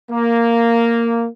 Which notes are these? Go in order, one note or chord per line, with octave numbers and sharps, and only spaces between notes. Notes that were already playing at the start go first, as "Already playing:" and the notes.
A#3